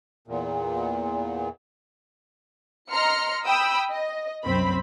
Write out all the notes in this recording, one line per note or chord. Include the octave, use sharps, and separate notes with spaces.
E2 A#2
D#5 A#5 C6 F6 C#7
G5 B5 D#6 E6
D#5
C2 F#2 C4 B5